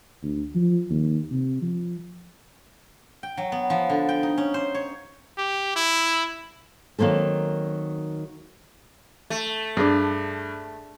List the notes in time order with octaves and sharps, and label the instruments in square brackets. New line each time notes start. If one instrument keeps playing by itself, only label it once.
[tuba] D2
F3
D#2
C3
F3
[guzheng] G5
F#3
B3
F3
D3
G5
D#4
C#4
C5
C#5
[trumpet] G4
E4
[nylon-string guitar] D#3 F#3 A#3 C4 A4
[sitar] A3
[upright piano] G2 [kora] D4 G#4